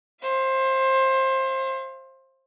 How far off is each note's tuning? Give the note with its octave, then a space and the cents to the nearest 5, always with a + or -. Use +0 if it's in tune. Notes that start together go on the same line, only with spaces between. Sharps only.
C5 +20 F5 -35